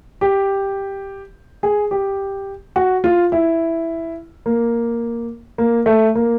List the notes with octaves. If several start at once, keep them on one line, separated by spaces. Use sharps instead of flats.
G4
G#4
G4
F#4
F4
E4
A#3
A#3
A3
A#3